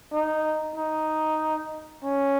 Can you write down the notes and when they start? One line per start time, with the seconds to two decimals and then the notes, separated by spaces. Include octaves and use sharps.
0.12 D#4
0.76 D#4
2.04 C#4